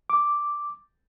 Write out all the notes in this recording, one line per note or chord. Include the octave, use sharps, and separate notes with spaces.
D6